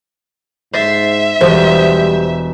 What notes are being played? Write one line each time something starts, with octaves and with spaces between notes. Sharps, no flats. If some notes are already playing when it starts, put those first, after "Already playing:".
G#2 C5 E5 A6 C7
E1 G3 C5 D#6